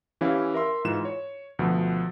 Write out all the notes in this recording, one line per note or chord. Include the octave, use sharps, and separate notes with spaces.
E3 C#4 E4 G4 F5
A#4 E5 C6
G#2 E3 F4 E7
C#5
D2 B2 F3